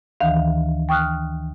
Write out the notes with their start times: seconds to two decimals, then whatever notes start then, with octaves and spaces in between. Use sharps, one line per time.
0.21 D2 D#3 E3 F5
0.89 G5 C#6 D#6 F6 F#6